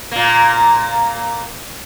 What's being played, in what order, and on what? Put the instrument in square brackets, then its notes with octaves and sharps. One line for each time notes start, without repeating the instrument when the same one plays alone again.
[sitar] A#2 A#3